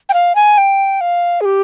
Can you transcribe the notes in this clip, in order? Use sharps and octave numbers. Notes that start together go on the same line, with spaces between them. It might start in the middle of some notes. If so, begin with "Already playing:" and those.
G5
F5
G#5
G5
F5
G#4
G4